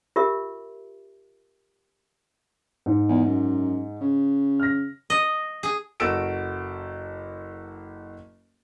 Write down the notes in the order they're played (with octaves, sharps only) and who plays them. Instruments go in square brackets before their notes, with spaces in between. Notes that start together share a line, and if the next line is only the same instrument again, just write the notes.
[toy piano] F4 G4 A#4 E5
[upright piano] G#2 D#4
[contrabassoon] E2
F#2
C#3
[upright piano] F6 A#6
[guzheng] D#5
G#4
[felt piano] F#1 F#4 A4 E6 D7 E7